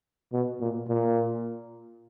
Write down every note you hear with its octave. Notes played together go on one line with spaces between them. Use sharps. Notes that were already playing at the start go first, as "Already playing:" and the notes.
B2
A#2
A#2